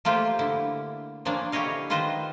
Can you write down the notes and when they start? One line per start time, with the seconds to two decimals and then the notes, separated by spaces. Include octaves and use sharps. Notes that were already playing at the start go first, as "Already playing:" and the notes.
0.05 A3 A#3 F4 G4 C5
0.39 D3 E4
1.25 F3 A#3 C#4 D4
1.52 D3 E4 G4 C#5 D#5 F5
1.90 D#3 F4 B4 C5 D#5